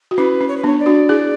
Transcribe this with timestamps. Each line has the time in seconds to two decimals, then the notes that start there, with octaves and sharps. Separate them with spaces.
0.11 F#4
0.17 C#4 E4 B4
0.41 C#4
0.48 C#5
0.57 B4
0.63 B3 D4 C#5
0.79 D5
0.86 D4 F#4
1.09 E4 G#4